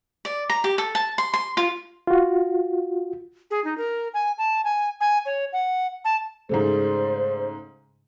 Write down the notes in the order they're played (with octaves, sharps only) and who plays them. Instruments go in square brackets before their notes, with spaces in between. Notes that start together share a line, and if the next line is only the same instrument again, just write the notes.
[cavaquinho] D5
A#5
G4
A4
A5
C6
C6
F4
[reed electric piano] F4 F#4
[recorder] G#4
D#4
A#4
G#5
A5
G#5
G#5
C#5
F#5
A5
[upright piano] G#2 C#3 A3 [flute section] C5 D5